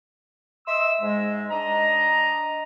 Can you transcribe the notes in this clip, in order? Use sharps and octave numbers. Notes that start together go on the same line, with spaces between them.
D#5 E5 C6 E6
G#2 G#3
D4 D#5 A#5